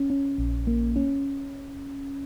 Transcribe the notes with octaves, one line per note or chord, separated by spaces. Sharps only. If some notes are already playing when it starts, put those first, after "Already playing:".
Already playing: C#4
C#4
A#1
A#3
C#4